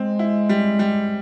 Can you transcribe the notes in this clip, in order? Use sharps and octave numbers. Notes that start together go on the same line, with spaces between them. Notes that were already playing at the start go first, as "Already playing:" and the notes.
Already playing: G#3 C4
E4
G3
G3